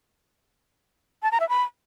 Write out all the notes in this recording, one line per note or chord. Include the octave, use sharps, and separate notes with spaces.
A5
A#5
E5
B5